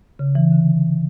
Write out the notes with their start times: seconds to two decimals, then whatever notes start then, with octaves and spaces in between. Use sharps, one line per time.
0.19 C#3
0.35 E3
0.52 D3